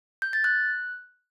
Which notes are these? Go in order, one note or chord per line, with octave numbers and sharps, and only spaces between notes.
G6
A6
F#6